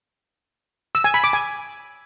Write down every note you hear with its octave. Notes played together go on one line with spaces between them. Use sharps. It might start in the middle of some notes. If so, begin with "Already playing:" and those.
E6
G#5
B5
D6
G#5